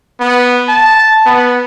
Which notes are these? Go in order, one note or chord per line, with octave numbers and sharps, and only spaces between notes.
B3
A5
B3